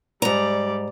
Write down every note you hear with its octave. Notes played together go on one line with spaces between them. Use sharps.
G#2 G3 D5 A#5